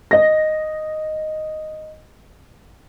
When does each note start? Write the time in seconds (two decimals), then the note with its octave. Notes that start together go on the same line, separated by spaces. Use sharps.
0.11 D#5 A#6